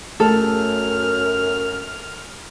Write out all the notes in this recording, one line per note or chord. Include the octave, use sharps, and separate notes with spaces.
F#2 A3 A4 F6